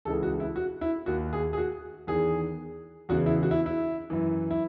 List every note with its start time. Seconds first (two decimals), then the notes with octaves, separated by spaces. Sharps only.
0.05 C#2 C#3 E3 A4
0.23 F#4
0.40 E4
0.56 F#4
0.81 E4
1.06 D#2 D#3 F#4
1.33 G#4
1.53 G#4
1.58 F#4
2.07 E2 D#3 G#4
3.09 E2 C#3 E3 F#4
3.26 E4
3.43 F#4
3.51 E4
3.66 E4
4.10 F#2 E3
4.51 E4